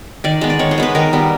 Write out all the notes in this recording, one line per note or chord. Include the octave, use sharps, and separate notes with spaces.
D#3 D5
G#3 B3
D5
D#3 C#5
C5
G#3 B3 B4
D#3 A#4
G3 B3